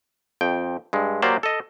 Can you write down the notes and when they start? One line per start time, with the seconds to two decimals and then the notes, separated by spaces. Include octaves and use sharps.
0.41 F2 G5
0.93 G2 G#3
1.22 F#3 A#3 G4 C5 D5
1.43 A4 D#5